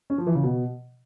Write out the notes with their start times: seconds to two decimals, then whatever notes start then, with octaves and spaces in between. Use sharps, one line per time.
0.10 C#4
0.18 F3
0.27 E3
0.35 C#3
0.43 B2